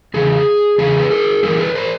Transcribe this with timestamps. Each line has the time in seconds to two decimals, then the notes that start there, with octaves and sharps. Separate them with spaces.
0.14 E2 C#3 G#4
0.78 E2 C#3 G#4
1.00 B4
1.10 G#4 A#4
1.43 G2 E3 G#4 A#4
1.59 A4 B4
1.75 A#4 C5